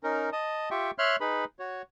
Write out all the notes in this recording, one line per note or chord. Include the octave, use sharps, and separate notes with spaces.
C#4 D#4 A#4
D#5 A5 D#6
F4 G4 E5 G5 C#6
C#5 E5 C6 F6 F#6
D#4 G#4 B4 B5
F#4 C#5